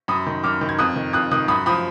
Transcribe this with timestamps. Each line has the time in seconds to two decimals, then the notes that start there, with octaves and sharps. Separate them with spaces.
0.08 F#2 B5 D#6
0.27 D#3
0.44 F#2 D6 F6
0.61 D#3
0.69 G#6
0.79 F2 D#6 F#6
0.96 D#3
1.13 F2 D#6 F#6
1.31 D#3 D#6 F#6
1.48 F#2 B5 D#6
1.66 F3 B5 D#6